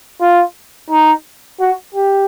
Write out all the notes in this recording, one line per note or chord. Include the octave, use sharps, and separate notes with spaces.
F4
D#4
F#4
G4